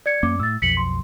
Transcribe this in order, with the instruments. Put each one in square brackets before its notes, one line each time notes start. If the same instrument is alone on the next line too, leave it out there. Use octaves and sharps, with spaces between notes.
[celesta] D5 G#6 C#7
[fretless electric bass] F#2 A#3 C#4 [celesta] D6
[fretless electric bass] A2 [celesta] E6 A6
[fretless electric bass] B1 F2 [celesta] B6 C#7 F#7
[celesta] C6